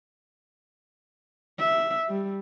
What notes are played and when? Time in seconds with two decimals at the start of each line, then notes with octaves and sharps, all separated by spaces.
1.59 E5
2.08 G3